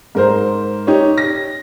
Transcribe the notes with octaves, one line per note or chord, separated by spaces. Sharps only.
G#2 A#4 C5
D#4 G4 C#5
A#6